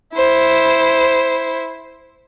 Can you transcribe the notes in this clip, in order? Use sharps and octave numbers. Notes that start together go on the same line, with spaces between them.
E4 C5